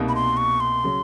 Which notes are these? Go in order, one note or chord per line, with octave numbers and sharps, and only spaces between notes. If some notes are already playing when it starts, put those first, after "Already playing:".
Already playing: C2 B2 G3 A#3 D#4
B5
C6
C#6
C6
C#3 F#3